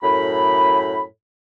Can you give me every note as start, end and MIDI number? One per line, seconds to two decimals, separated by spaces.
0.02 1.01 42
0.02 1.01 45
0.02 1.01 83